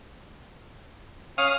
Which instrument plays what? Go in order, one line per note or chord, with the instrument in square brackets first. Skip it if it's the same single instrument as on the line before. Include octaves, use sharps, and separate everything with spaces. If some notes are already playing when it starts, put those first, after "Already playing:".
[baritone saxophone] C#4 [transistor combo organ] F5 D#6